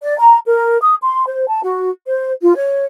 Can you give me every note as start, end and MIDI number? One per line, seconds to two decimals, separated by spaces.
0.03 0.16 74
0.19 0.38 82
0.46 0.78 70
0.81 0.94 87
1.02 1.25 84
1.27 1.47 72
1.48 1.61 81
1.64 1.89 66
2.06 2.31 72
2.42 2.55 65
2.55 2.85 73